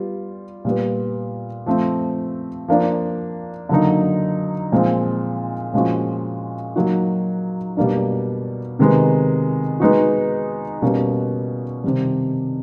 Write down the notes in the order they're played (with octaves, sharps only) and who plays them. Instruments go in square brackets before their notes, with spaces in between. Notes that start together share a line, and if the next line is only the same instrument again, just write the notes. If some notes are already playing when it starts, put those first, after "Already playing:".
Already playing: [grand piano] G3 B3 F4
A#2 G3 B3
F3 A3 C4
F3 A#3 D4
D3 F#3 A#3 D#4
A#2 F3 G#3 C4
A#2 F3 G#3 C#4 F#4
F#3 A#3 D#4 F#4
B2 G3 A#3 D4
C3 D#3 G#3 B3
G#3 B3 D#4 F#4
B2 G3 A#3 C#4
C3 D#3 G3